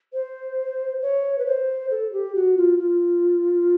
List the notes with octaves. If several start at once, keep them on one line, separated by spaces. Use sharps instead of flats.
C5
C#5
B4
C5
A4
G4
F#4
F4
F4